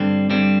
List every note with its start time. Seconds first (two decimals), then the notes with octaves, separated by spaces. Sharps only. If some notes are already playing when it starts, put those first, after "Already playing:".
Already playing: G2 D3 G3 C4
0.30 G2 D3 G3 C4